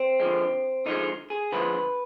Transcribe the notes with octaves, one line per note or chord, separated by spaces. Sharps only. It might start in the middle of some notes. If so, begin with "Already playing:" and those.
Already playing: C4
D3 F3 G#3
D3 F3 G#3 D#4
G#4
D3 F3 G#3 B4